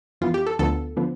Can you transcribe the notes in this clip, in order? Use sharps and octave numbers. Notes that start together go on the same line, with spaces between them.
F2 E3 B3 F4
G4
A4
D2 D3 F3 B3 A4
D3 F3 B3